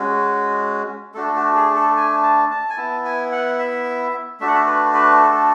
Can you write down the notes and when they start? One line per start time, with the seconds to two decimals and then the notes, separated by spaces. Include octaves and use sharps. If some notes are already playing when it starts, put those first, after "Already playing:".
Already playing: G#3 C#4 F#4
1.14 A3 D4 F#4 A4
1.35 F#4
1.55 G#4
1.75 A4
1.97 G#5
2.23 A5
2.51 A5
2.70 G#5
2.78 B3 E4 A5
3.05 G#5
3.32 F#5
3.59 E5
4.40 A3 D4 F#4 E5
4.48 F#5
4.54 E5
4.67 B4
4.94 B4
5.21 A4